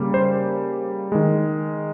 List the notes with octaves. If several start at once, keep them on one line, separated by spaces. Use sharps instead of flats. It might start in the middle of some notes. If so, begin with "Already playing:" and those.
Already playing: C#3 G3 A#3
C5
D#3 G#3